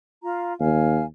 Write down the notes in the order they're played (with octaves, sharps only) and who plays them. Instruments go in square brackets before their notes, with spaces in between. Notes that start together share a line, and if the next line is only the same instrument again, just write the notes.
[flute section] F4 F5 A#5
[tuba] D#2 [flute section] F5 G#5